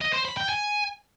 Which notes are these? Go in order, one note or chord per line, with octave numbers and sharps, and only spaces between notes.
D#5
C5
B5
G5
G#5